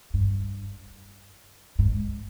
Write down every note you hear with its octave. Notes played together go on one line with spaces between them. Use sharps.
G2
G#2